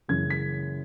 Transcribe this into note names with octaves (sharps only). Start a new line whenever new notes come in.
F#1 F#2 C#3 E3 G#3 G#6
B6